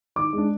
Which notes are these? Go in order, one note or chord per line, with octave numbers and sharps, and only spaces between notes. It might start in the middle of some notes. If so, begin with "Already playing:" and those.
D#3 D6
G#3 D4